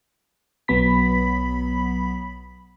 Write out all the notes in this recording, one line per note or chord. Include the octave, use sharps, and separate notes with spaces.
B1 F#3 B3 B5 B6